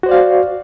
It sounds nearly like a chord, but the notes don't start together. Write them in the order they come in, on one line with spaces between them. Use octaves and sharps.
F#4 C5 D5 F5